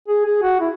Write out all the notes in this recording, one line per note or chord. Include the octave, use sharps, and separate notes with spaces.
G#4
G#4
F#4
E4